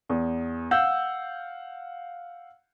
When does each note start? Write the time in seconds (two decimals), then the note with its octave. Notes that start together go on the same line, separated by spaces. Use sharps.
0.09 E2
0.71 F5 F#5 E6 G6